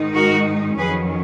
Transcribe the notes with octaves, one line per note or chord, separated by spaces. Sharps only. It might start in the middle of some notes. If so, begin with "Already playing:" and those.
Already playing: G#2 D#3 G#3 D#4
F#4 A#4
F2 D#3 F#3 C#4 G#4 B4